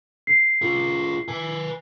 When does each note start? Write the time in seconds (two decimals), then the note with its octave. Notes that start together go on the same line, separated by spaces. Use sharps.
0.27 C7
0.62 F4 G#4
1.28 B4 G#5